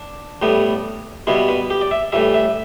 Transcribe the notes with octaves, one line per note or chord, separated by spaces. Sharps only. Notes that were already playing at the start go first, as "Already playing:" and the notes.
Already playing: D4
A2 G3 B3
B2 G3 B3 E4
B4
G4
D5
E5
A2 E3 G3 E5
E5